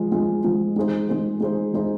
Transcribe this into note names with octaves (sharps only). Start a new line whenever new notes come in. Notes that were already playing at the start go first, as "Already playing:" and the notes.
Already playing: F3 G#3 F4
F3 G#3 F4
F3 G#3 F4
G#3 D#4 G#4 C5
G#3 D#4 G#4 C5
G#3 D#4 G#4 C5
G#3 D#4 G#4 C5